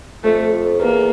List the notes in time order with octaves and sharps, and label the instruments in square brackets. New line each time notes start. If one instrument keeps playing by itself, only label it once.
[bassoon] F2 [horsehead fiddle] A3
[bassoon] F2
[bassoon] E2 [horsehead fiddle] A#3